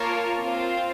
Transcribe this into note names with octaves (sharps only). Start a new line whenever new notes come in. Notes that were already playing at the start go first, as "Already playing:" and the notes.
Already playing: A#3 F4 A#4 C#5 A5
C4 F4 C5